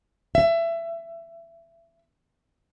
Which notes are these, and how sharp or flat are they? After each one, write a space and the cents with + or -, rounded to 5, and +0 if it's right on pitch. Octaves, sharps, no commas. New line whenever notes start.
E5 +25